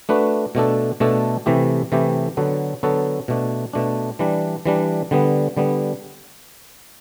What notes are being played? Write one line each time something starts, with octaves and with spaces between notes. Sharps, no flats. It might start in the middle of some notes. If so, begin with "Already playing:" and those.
A3 D4 F#4 B4
B2 A3 D4 A4
B2 A3 D4 A4
C3 E3 A3 E4 G4
C3 E3 A3 E4 G4
D3 F#3 B3 F#4 A4
D3 F#3 B3 F#4 A4
B2 A3 D4
B2 A3 D4
E3 G3 D4
E3 G3 D4
D3 G3 B3
D3 G3 B3